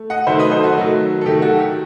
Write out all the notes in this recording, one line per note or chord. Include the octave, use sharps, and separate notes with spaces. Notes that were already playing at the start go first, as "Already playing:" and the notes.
Already playing: A3
D#5 F#5
D#3 F#3 A3 C5 E5
B4 D#5
A4 C5
F#4 A4
D#3 F#3 A3
A4
D#3 F#3 A3 G4
F#4 A4
G4